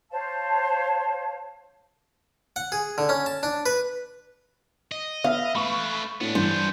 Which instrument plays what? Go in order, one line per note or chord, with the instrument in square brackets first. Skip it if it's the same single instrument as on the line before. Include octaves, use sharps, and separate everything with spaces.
[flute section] C5 C#5 F5 A5
[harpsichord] F#5
G#4
D3
C#4
A5
D4
B4
[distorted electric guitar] D#5
[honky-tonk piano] B3 E5 [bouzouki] F5
[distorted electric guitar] A3 B4 [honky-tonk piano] B5 C#6
[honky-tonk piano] A2 [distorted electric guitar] B3 D4
[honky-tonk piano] G2 E3 [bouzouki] C5